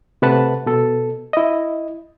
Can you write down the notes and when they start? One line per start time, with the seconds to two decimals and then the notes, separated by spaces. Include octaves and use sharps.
0.22 C3 A3 B4 F#5 A5
0.66 B2 A4
1.33 E4 D#5